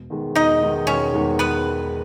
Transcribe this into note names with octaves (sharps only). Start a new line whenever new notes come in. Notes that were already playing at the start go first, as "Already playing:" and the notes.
Already playing: E1
E2 D#3 G#3
E1 D#4 D#5
E2 D#3 G#3
E1 C#4 C#5
E2 D#3 G#3
B3 B4